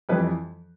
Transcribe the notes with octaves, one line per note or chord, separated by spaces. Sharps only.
F2 E3 G3 B4